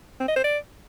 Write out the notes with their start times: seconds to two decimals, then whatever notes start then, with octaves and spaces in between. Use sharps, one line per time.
0.20 C4
0.28 D#5
0.36 C5
0.44 D5